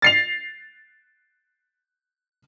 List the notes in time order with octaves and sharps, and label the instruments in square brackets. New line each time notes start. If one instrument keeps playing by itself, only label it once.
[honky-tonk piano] A6 C7 F7